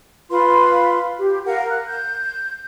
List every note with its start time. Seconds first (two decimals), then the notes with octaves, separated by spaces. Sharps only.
0.30 F4 B4 B5 C6
1.19 G4
1.46 A#4 F5 F#5
1.69 F#6
1.86 G6